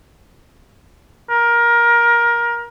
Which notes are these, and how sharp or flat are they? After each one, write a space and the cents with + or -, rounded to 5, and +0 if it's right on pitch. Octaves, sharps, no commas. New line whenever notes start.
A#4 +20